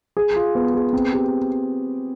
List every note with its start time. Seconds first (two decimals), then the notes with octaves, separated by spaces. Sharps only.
0.17 G#4
0.36 F4
0.55 B3
0.74 G#4
0.93 C4
1.13 G4